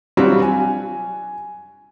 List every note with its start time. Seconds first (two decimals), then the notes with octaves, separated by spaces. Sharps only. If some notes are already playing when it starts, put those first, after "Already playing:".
0.17 F#3 G3 C4 D4 F4 F#4
0.42 G#5